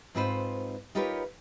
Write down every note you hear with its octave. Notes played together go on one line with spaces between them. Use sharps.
G#2 C4 D#4 F4 B4 C5
D#4 F4 G4 A#4 B4 C#5